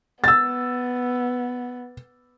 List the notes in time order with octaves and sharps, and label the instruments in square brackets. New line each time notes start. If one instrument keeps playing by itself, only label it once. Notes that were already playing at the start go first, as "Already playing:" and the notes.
[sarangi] B3 [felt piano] E6 A6